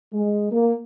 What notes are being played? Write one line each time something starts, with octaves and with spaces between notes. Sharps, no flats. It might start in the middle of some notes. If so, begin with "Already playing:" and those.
G#3
A#3